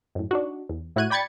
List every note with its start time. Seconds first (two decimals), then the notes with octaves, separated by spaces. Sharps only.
0.15 F#2 A2
0.31 D4 D#4 F#4
0.69 E2
0.96 A2 E4 F#4 F#6 G#6 D#7
1.10 D5 G5 B5 G#6 A6 C#7